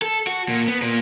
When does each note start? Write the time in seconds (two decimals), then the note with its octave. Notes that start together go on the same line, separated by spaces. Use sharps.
0.02 A4
0.27 F#4
0.48 A#2
0.68 B3
0.82 A#2